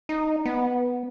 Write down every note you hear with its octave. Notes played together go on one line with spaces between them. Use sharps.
D#4
B3